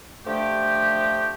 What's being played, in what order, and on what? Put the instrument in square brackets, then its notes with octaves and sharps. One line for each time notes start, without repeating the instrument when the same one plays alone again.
[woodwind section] D3 F3 A3 G4